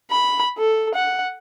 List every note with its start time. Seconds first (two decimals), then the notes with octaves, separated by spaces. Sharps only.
0.11 B5
0.57 A4
0.95 F#5